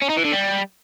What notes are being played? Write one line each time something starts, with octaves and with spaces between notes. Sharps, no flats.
C#4
D#4
E3
D3
G3